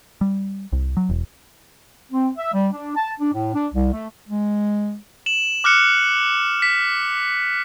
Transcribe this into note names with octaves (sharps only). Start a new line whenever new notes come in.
G3
C2
F#3
E1
C4
E5
G3
D4
A5
D4
A2
D4
C2
A3
G#3
E7 F#7
D6 F6 F#6 C#7
B6